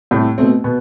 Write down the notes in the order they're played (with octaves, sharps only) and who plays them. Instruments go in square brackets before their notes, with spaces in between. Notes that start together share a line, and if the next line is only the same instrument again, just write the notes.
[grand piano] C2 [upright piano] A2 A3
[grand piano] B2 A3 C4
[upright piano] B2 B3